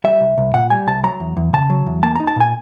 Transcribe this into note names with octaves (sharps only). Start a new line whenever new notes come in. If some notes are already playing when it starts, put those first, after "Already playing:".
G3 E5
C2
C2
A#2 F#5
G3 G#5
C2 A5
F#3 A#5
E2
E2
C#3 A5
F#3
E2
A#3 A5
D#4 A#5
A5
A#2 G#5